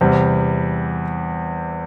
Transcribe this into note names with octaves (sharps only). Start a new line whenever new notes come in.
E2 C3 G3